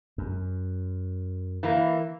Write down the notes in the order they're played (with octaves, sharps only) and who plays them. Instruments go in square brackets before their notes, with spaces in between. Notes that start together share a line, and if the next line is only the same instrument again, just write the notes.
[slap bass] F#2
[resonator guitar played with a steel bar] E3 A#3